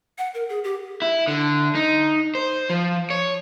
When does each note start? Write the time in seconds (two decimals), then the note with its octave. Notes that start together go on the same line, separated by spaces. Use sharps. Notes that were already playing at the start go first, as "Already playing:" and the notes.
0.18 F#5
0.34 A#4
0.49 G#4
0.64 G4
1.02 E4
1.28 D3
1.75 D#4
2.35 C5
2.70 F3
3.10 C#5